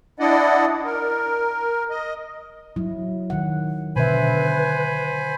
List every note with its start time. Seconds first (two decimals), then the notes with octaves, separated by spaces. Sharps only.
0.20 D4 E4 D5 D#5 F#5
0.85 A#4
1.90 D#5
2.76 F#3 E4
3.30 D#3 F#5
3.96 B2 D3 B4 C5 E5 G#5 B5